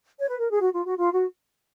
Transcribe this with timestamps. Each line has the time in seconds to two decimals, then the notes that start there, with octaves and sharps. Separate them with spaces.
0.19 C#5
0.29 B4
0.40 A#4
0.50 G#4
0.61 F#4
0.73 F4
0.86 F#4
0.98 F4
1.13 F#4